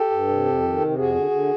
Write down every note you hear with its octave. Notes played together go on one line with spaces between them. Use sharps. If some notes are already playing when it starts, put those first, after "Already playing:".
Already playing: G4 A4
G2
C3
F2
D#3
C3
F2 F#4 G#4
D3
D3